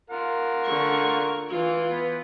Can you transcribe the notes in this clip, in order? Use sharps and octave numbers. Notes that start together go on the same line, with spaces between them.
F4 A#4 F#5
D3 C#6
E3 F4
B3